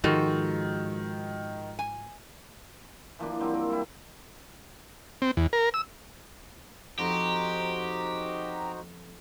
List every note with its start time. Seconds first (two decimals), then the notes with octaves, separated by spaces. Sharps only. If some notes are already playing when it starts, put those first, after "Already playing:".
0.04 G#2 D#3 F3 G#3 F4 F#4 A4
1.79 G#5
3.19 E3 F3 A#3 D4
3.40 F#3 G3 C4 F4
3.54 A#4
3.70 G3 E4
5.22 C4
5.37 E2
5.53 A#4
5.74 E6
6.99 F2 D#4 F#4 G4 C5 A#5